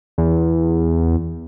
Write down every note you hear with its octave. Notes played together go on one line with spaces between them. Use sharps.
E2